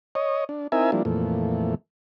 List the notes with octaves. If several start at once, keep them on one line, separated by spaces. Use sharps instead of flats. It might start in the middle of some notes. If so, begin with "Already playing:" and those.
C#5 D#5
D4
C4 D#4 E4 A#4 E5 G#5
F3 G3 A#3 D4 E4
F2 A#2 E3 A3